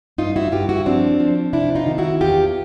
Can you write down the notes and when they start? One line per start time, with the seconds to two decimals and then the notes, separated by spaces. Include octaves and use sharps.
0.18 G2 D#4 F4
0.36 E4 F#4
0.52 G2 F4 G4
0.69 E4 F#4
0.86 F3 C4 D4
1.20 F3
1.53 C3 D4 E4
1.75 D#4 F4
1.87 D#3
1.98 E4 F#4
2.21 E2 F4 G4